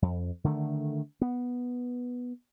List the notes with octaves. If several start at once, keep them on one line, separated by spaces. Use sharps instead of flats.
F2
D3 D#3 G3 A3
B3